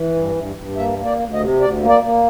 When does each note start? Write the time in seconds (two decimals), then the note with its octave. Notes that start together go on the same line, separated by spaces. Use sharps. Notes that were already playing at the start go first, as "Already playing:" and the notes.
Already playing: E3
0.15 G2
0.35 G2
0.56 G2
0.77 A#3 E5
0.99 A#3
1.05 D5
1.19 D2
1.33 D#5
1.40 C3
1.61 D2 D5
1.81 A#3
1.89 D5
2.03 A#3